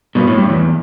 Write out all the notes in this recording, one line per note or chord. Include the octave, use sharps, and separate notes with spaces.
G2 B2
A2
G2
E2